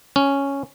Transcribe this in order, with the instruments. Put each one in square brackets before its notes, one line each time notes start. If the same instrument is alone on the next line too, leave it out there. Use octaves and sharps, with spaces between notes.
[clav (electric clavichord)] C#4